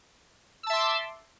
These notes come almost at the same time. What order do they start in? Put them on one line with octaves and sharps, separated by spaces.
E6 A5 E5 C6 D6